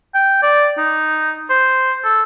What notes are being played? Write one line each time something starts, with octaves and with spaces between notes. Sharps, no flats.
G5
D5
D#4
C5
A4